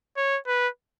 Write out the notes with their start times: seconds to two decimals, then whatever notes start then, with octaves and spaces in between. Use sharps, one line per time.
0.17 C#5
0.47 B4